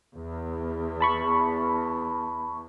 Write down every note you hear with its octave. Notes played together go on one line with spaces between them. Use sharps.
E2
A5 B5 C#6